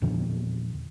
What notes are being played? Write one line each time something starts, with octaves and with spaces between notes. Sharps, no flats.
E2 A#2 D3 F3